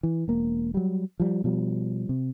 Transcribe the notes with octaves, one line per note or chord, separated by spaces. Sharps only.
E3
E1 A#3
F#3 G3
F3 G3
B2 F3 G3
C3